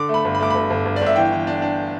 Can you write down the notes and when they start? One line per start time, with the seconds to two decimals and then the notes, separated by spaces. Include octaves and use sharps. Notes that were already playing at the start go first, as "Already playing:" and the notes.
Already playing: D3 D6
0.09 A3
0.14 B5
0.25 G1
0.35 B5
0.40 A3 D6
0.50 G1 B5
0.70 G1
0.86 G1
0.96 D5
1.01 G1
1.06 E5
1.16 E3 G5
1.32 E3
1.47 D4
1.62 D4